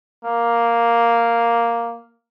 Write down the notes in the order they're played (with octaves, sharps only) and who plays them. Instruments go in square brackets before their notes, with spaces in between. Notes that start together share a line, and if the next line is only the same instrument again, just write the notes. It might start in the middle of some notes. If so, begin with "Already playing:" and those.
[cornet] A#3